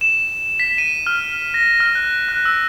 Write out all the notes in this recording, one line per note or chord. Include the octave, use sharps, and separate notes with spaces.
E7
B6
D#7
F6
A#6
F6
F#6
F#6
E6